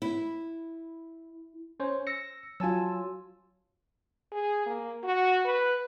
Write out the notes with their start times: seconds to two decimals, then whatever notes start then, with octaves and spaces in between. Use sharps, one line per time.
0.02 E4
1.80 C#4 C5 C#5
2.07 E6 A#6 C#7
2.60 F#3 F4 G#5 A5 E6
4.32 G#4
4.66 A#3
5.04 F#4
5.45 B4